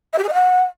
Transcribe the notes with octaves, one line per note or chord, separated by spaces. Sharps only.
E5
G4
G#4
D#5
F#5